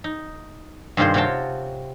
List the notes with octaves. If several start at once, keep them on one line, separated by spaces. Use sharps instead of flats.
D#4
G2 C3 D#3 F4 G#4 C5
C3 F4 F#4 C#5 G5 A5